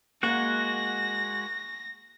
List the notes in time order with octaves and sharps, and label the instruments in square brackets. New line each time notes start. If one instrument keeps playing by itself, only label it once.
[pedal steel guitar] G#3 F#4 F#5 [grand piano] A#3 [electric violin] A#6